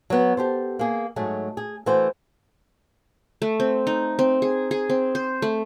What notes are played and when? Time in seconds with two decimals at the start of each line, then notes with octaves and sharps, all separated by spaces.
0.10 F#3 B3
0.37 G4 A4 C5
0.79 A#3 G#4
1.16 G#2 F#3 A3 G#4
1.57 G#4
1.86 E3 A3 F#4 B4 C5
3.42 A3
3.60 C4
3.87 D#4
4.19 C4
4.42 G#4
4.71 G#4
4.90 C4
5.15 C5
5.42 A3